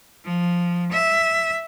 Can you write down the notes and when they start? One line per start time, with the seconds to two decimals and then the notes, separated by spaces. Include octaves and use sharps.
0.24 F3
0.92 E5